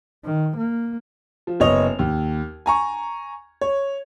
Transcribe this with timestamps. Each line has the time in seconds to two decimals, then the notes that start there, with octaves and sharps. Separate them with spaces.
0.24 D#3
0.57 A#3
1.47 F3
1.60 F#1 B3 C#5 D#5 F7
1.99 D#2
2.66 G#5 A#5 C#6
3.61 C#5